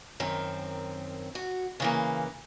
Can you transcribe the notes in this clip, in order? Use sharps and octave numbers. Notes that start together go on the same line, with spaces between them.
F#2 D#3 C4
F#4
C#3 E3 A#3